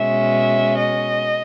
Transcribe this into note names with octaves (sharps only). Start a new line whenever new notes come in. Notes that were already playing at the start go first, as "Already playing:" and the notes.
Already playing: B2 G#3 C#4 E5
D#5